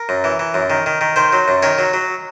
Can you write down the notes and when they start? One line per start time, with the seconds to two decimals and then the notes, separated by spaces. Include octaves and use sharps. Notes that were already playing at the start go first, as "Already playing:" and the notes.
Already playing: A#4
0.09 F#2
0.24 E3
0.39 E3
0.54 F#2
0.70 D#3
0.86 D#3
1.01 D#3
1.16 D#3 C5
1.33 F#3
1.48 F#2
1.62 D#3 C#5
1.78 F#3
1.93 F#3